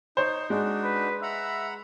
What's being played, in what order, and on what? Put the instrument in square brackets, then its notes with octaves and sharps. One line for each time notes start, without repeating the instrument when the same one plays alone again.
[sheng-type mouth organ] D#4 [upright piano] C5 C#5
[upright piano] G#3 [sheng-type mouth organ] D4 D#4 F#4
[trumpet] B4
[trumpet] E5 [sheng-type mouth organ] F#5 A#5 B5